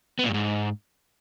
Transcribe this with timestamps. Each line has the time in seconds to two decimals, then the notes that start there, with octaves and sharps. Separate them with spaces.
0.19 B3
0.24 A#2
0.29 G2
0.34 G#2